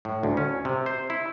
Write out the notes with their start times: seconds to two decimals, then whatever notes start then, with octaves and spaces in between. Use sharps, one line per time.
0.05 A2
0.23 D2
0.37 C#4
0.65 C3
0.86 C5
1.10 E4